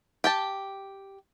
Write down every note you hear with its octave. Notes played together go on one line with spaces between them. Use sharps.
G4 G5 A5